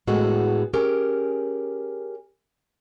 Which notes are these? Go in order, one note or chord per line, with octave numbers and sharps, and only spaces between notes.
A2 G#3 B3 F#4 G#4 A4
C#4 G4 G#4 A#4